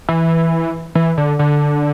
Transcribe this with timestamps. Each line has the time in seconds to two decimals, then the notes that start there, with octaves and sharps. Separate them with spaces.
0.09 E3
0.95 E3
1.17 D3
1.39 D3